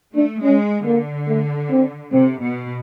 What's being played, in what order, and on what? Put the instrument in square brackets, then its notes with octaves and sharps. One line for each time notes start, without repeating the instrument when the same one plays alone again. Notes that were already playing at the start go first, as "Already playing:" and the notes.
[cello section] A3 [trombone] D4
[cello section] G#3 [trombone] C#4
[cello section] D3 [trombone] A#3
[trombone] A3
C4
[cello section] C3 [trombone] C4
[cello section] B2